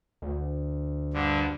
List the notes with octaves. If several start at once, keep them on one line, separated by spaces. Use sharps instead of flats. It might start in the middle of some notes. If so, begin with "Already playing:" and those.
D2
G2 D3